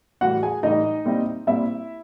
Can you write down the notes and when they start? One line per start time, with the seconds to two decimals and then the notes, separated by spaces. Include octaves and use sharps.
0.21 A2 E3 G3 F#4 F#5
0.43 G#4 G#5
0.63 A2 E3 G3 D#4 D#5
1.05 A#2 G3 C4 E4
1.47 A#2 G3 C4 E4 E5